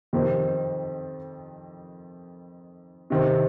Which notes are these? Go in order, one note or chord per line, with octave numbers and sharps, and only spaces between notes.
F2 D#3 C4 G4 A#4
C3 D#3 C4